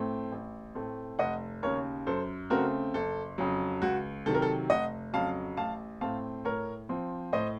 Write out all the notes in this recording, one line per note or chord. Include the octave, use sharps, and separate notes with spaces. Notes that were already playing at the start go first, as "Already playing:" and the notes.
Already playing: A2 A3 C4
A1
A2 A3 C4
F1 D#5 F#5
D#2 C#3 A#4 C#5
F#2 A4 C5
C#3 A3 C4 F#4 A#4
F#1 A4
F2 C#3 F#3
C#2 F#4
C3 D#3 F#3 A4
A#4
A4
F1 D#5 F#5
F2 C#3 F#3 F5 A5
A1 F5 A5
A2 A3 C4 F5 A5
A2 A#4 C#5
F3 C4
A2 C5 D#5